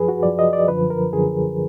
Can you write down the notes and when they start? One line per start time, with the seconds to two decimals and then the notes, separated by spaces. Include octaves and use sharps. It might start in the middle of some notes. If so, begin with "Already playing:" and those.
Already playing: F#2 F3 G#4 B4
0.08 F#4
0.23 F#2 F3 D5
0.39 D#5
0.53 D5
0.68 F#2 D3 F3 B4
0.90 A#4
1.13 F#2 D3 F3 G#4